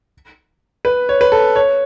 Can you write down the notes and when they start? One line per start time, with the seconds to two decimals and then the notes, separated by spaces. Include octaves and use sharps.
0.85 B4
1.09 C#5
1.21 B4
1.32 A4
1.56 C#5